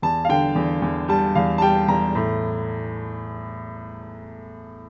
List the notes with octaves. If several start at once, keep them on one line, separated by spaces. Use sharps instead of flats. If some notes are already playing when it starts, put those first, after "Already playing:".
E2 A5
F5
D3 G5
E2
E2
G3 A5
E2 F5
A5
G3 G5
E2 A#5
A2